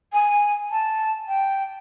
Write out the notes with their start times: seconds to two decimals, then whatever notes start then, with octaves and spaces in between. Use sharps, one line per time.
0.12 G#5
0.70 A5
1.27 G5